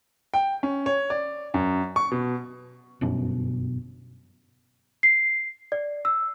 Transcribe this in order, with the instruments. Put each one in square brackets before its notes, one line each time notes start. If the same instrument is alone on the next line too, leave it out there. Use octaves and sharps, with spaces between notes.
[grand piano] G5
C#4
C#5
D5
F#2
C#6
B2
[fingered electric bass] G1 F#2 B2 C#4
[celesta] C7
D5
E6